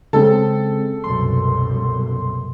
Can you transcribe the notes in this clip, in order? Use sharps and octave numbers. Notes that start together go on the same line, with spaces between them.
C#3 G#3 C4 A4
C2 F#2 B2 C6